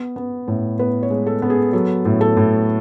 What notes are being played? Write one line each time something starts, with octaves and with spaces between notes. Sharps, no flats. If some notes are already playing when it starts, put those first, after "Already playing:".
Already playing: B3
B3
A2
B3 B4
C#5
G#3
A4
B3
G#4
F#3 A4
A2
A4
A2